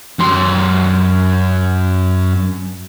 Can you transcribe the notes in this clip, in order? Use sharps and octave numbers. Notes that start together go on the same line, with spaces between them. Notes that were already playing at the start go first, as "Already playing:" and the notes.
F#2 C6